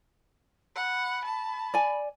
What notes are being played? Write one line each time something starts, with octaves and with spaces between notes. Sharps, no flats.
F#5 B5
A5
D5 G#5